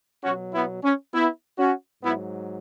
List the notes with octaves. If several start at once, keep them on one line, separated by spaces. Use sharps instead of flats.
B2 F#3 C#4 F#4
B3 E4
C#4
B3 E4
C#4 F#4
G#2 F#3 B3 E4